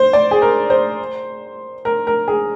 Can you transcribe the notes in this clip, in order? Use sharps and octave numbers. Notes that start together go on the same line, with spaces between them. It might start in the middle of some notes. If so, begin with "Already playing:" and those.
Already playing: C5
D5
G#4
A#4
C5
A#4
A#4
G#4